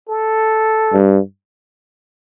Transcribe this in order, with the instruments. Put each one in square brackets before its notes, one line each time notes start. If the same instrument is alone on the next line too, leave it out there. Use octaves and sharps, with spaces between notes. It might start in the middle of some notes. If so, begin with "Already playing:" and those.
[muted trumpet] A4
[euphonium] G2